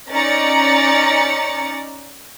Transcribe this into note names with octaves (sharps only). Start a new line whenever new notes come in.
C#4 D#4 D5 A#5 A6 C#7